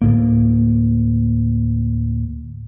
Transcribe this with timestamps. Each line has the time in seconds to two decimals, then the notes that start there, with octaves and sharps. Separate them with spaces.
0.02 D2 A2 A#3